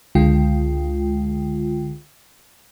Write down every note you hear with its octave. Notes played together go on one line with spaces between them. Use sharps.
C#2 D3 G#3 F4 G5